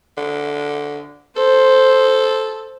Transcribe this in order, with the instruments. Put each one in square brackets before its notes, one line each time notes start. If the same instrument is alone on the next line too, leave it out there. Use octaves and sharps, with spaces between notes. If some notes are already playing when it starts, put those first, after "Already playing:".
[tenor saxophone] D3
[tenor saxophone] A4 [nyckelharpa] C5